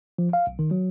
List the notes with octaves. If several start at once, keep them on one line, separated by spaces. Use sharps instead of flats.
F3
F5
B1
D#3
F#3